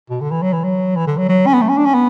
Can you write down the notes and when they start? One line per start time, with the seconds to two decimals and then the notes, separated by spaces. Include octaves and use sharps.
0.10 B2
0.21 D3
0.31 E3
0.42 F#3
0.53 E3
0.64 F#3
0.96 E3
1.07 D3
1.18 F#3
1.29 F#3
1.47 C#4
1.54 B3
1.61 A3
1.69 C#4
1.77 D4
1.85 C#4
1.94 B3